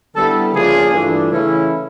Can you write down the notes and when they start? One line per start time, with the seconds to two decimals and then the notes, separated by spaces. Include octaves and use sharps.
0.15 D3 G3 B3 E4 A4
0.53 C#3 F3 A#3 D4 F4 G#4
0.92 G2 E3 A3 D4 F4
1.31 C#3 E3 A3 C#4 E4